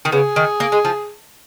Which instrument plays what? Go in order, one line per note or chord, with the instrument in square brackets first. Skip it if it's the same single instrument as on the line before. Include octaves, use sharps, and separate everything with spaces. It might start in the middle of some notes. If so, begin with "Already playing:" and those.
[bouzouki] D#3
[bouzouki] C#3 [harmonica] B3 G#4
[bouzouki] D#3
A#3
G#3
F3